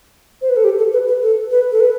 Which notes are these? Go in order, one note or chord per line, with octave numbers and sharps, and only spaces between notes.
C5
B4
A4
G4
A4
B4
B4
A4
B4
A4
B4